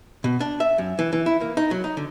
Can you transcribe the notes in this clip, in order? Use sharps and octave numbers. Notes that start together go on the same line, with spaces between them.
B2
D4
E5
F#2
E3
E3
E4
A#3
D#4
F#3
D#4
D3